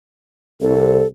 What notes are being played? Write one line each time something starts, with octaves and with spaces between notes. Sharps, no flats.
C2 A4